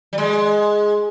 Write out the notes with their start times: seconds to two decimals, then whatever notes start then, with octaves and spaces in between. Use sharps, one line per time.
0.13 G3
0.18 G#3